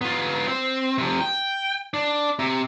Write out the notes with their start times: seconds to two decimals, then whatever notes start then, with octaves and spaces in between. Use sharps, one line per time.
0.01 B3 F4
0.48 C4
0.98 C3 F3
1.20 G5
1.94 D4
2.39 C3